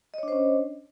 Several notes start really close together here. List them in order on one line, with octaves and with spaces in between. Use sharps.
D#5 C#5 D4 C5 C#4